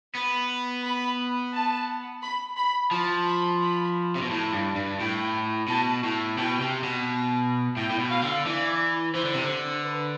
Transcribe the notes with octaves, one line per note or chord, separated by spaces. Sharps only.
B3 B5
B5
A5
B5
B5
F3 A5
B5
B5
C3
B2
A2 A5
G2
G2
A2 G5
B2 A5
A2
B2 G5
C3
B2
A2 G5
A2
B2
F5
D3
E3 D5
E3 C5
D3
C3
D3
B4